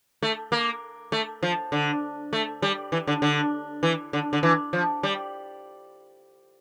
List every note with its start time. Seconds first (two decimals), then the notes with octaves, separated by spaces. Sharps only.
0.23 A3
0.52 A#3
1.12 A3
1.43 F3
1.72 D3
2.33 A3
2.62 G3
2.92 E3
3.07 D3
3.22 D3
3.83 E3
4.13 D3
4.33 D3
4.43 E3
4.73 F3
5.03 G3